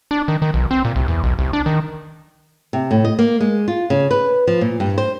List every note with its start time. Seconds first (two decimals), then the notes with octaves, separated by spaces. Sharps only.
0.11 D4
0.28 D#3
0.42 D#3
0.54 B1
0.71 C4
0.85 A#2
0.96 C2
1.08 E2
1.24 B1
1.39 C2
1.53 D4
1.66 D#3
2.73 C3
2.91 A2
3.05 D#5
3.19 A#3
3.40 G#3
3.68 F4
3.90 C#3
4.11 B4
4.47 F3
4.61 A#2
4.80 G2
4.98 C5